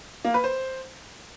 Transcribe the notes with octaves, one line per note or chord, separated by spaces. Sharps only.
A#3
B4
C5